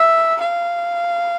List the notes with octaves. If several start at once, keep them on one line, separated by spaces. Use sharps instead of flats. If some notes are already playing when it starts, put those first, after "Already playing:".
Already playing: E5
F5